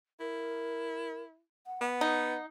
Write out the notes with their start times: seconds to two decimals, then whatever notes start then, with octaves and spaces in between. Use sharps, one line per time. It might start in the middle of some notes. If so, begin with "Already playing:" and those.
0.20 E4 A#4
1.67 F#5
1.81 B3
2.01 D#4